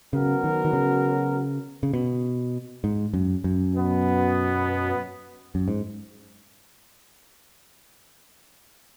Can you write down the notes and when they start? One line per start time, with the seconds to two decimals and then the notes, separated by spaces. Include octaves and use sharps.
0.13 C#3 F#3 B3 F#4 A#4
0.44 D#3
0.65 D#3
0.73 C#3
1.83 C#3
1.93 B2
2.84 G#2
3.14 F#2
3.44 F#2
3.75 B2 F#3 B3
5.55 F#2
5.68 G#2